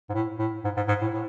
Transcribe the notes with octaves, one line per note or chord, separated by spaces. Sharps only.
G#2
A2
A2
G#2
G#2
G#2
A2
A2